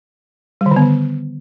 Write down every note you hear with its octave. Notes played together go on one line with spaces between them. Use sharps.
G3
D#3
D3
B3
D3